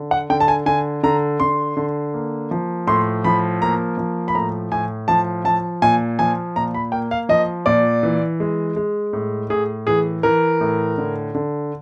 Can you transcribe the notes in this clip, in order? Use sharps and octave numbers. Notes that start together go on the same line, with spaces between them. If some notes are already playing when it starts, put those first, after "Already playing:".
Already playing: D3
F#5
D3 G5
A5
G#5
D3 G#5
D3 A#5
D3 C6
D3
A#3
F3
A2 C6
F3 B5
A#3 A#5
F3
B5
A2 A#5
A2 G#5
F3 A5
F3 A5
A#2 G#5
F3 G#5
A#2 A#5
B5
A#3 G5
F5
F3 D#5
A#2 D5
E3
G#3
G#3
A2
A2 G#4
E3 G#4
E3 A#4
A2
D3
D3